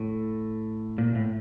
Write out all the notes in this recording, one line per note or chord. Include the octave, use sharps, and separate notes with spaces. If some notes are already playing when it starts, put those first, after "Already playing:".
Already playing: A2
A#2
A2